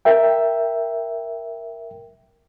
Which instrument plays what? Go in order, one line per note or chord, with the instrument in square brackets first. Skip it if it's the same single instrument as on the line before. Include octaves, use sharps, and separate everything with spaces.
[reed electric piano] A#4 E5 G5